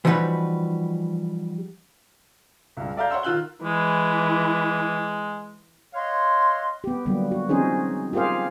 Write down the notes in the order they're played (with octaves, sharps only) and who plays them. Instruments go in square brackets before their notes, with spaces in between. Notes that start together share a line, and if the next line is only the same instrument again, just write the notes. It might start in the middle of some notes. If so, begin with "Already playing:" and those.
[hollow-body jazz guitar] E3 F3 G3 D#4 F#4 B4
[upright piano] C#2 G2
A4 D5 E5 F5 A#5 G6
C#5 F#5 C6 E6
D#3 F4 E6 F#6 G7
[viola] E3 [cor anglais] G#3
[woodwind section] C#5 D#5 F5 F#5 C6
[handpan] B3 G4
D3 F#3 G3 A#3 B3
F#4
F3 C4 C#4 D#4 G#4 C5
F4 G4 G#4 A#4 C5 F5